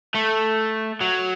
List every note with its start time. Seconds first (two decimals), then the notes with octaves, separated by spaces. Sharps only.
0.15 A3
1.01 F#3